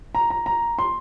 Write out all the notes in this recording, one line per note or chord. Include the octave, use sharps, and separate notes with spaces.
A#5
A#5
A#5
C6